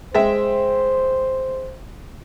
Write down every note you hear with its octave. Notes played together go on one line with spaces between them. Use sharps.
G#3 C5 E5 G5